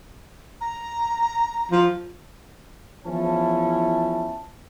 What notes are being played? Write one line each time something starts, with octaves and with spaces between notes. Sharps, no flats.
A#5
F3
E2 F3 C#4 E4 A5